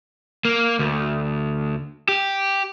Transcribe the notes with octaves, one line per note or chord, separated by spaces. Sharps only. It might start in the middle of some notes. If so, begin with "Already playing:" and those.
A#3
D2
G4